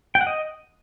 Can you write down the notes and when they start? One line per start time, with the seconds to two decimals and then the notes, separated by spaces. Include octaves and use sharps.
0.15 G5
0.21 F#5
0.27 D#5